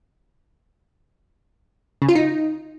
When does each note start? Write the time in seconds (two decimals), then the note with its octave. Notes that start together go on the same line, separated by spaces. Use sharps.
2.02 C#3
2.09 F4
2.15 D#4